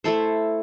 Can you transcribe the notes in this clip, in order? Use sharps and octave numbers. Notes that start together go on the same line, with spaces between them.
A3 E4 A4 C5